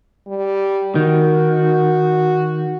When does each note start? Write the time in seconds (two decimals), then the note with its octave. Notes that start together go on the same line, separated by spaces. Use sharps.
0.28 G3
0.95 D#3 F#4